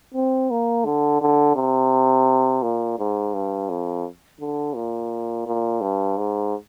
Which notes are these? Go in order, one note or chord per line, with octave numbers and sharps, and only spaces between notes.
C4
A#3
D3
D3
C3
A#2
G#2
G2
F2
D3
A#2
A#2
G2
G#2